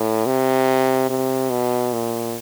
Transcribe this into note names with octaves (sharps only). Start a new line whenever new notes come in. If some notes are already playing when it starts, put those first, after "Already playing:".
Already playing: A2
C3
C3
B2
A#2